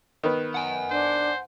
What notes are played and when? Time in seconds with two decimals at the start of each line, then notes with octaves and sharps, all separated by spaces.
0.23 D#3 B3 B4
0.55 F#5 G#5
0.91 D4 C5